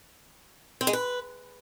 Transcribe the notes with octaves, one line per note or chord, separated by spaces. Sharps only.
C4
G#3
B4